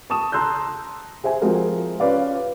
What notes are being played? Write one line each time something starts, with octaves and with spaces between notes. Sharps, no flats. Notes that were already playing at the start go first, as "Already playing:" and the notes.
A5 C#6 D#6 E7
A5 A#5 C6 E6 F#6 G6
G#4 C5 E5 G#5
F3 G#3 C4 F#4 A#4
C#4 F4 B4 D5 F5